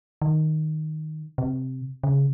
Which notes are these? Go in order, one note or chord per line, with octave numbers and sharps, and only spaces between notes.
D#3
C3
C#3